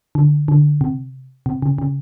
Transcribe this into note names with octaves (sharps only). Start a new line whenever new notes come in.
D3
D3
C3
C3
C#3
C#3